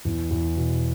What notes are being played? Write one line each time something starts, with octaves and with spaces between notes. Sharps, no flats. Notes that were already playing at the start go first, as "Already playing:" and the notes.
E2
E2
B2